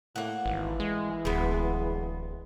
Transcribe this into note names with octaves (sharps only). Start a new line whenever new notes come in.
A2 A#3 F#5
G#1 E3
G#3
D1 G#3 B3